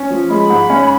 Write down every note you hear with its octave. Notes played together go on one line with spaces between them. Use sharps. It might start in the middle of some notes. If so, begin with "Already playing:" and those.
Already playing: C#4
F3
G#3 B5
G#2
C#4